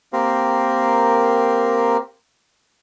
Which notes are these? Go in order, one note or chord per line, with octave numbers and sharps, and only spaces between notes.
A#3 C4 G4 A#4